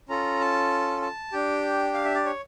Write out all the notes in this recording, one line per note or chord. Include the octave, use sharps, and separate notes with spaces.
C#4 F4 A4 A#5
A5
A5
D4 G4 G5
F5
E5
D5
C#5